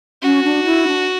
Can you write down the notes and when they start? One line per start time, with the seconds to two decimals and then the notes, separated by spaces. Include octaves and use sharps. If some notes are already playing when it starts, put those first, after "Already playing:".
0.23 C#4 F#4
0.44 D4
0.66 E4
0.87 D4